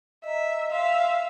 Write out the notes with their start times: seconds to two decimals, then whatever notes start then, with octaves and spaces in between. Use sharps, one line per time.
0.24 D#5 E5 A#5
0.71 E5 F5 C6